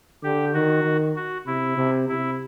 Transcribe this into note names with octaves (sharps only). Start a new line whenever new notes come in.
D3 G4
D#3 F#4
D#3
F#4
C3 E4
C3
C3 E4